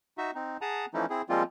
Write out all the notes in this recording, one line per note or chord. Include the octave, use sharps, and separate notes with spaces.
D#4 F#4 E5
C4 D#4
G#4 F#5 A5 A#5 D#6
E3 F3 A3 C#4 D#4 E4
C4 E4 G#4
F3 G3 G#3 A#3 C4 F4